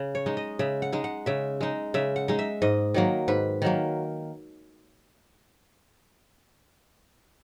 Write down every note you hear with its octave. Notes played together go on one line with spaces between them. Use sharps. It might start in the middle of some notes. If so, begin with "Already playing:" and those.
Already playing: C#3
C#5
G#3 D#4
D#5
C#3 E5
F#5
G#3 D#4
F#5
C#3 E5
G#3 D#4
C#3 E5
F#5
G#3 D#4
E5
G#2 D#5
D#3 F#3 A#3
G#2 B4
D#3 F#3 A#3